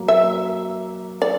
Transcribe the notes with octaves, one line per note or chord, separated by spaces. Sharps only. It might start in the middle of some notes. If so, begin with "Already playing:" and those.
Already playing: F#3 A#3
E5
D5